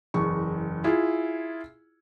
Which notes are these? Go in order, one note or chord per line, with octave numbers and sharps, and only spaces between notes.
F#1 E2 C#6
E4 F4 G#4